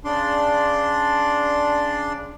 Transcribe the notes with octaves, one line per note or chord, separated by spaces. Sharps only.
C#3 D4 D5 C6